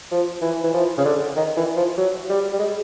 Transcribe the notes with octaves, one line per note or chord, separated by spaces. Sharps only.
F3
E3
E3
F3
C#3
D3
D#3
E3
F3
F#3
G3
G3
G#3